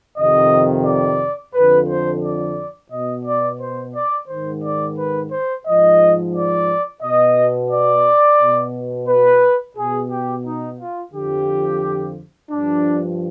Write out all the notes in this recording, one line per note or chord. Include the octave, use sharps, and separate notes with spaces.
F2 C3 D#3 D#5
D5
F2 D3 F3 B4
C5
D5
B2 D#5
D5
C5
D5
G#2 D#3 C5
D5
B4
C5
G#2 F3 D#5
D5
B2 D#5
D5
B2
B4
B2 G#4
G4
D#4
F4
F2 D3 F3 G4
G2 F3 D4